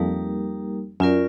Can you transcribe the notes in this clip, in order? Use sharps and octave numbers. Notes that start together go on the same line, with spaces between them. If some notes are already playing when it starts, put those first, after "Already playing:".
Already playing: F2 G3 A#3 D#4 G4 A#4
F#2 C#4 F4 A#4 D5